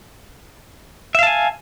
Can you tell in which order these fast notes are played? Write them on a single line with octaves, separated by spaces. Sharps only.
E5 F5 A5 G#5